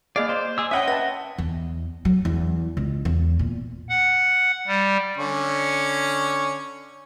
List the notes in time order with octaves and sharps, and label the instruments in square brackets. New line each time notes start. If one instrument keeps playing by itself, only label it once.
[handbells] A#3 D#5 C7 [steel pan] G#4 F5 [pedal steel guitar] D5
[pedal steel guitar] C5 [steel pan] D5
[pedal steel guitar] G#4 E6 [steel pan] D6
[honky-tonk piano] C#4 F#5 G5 [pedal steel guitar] D#5 E5 [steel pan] B5 C6 D#6
[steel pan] B4 A5 [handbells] A#6
[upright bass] E2
F#3
E2
C#2
E2
A#2
[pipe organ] F#5
G3
[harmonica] D3 C#4 C#6